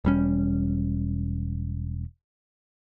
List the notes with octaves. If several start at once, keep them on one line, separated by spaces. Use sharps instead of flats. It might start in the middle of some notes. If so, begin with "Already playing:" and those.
E1 G3 C#4